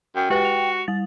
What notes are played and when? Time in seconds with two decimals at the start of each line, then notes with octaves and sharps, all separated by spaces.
0.16 F#2 G5
0.30 G#3 F#4 G4 B4
0.45 F7
0.88 G3 A6